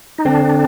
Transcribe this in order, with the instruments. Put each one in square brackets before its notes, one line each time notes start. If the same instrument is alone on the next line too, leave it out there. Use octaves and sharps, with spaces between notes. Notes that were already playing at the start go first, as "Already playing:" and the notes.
[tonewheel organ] D#4
[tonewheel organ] D3 D4 [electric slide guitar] C4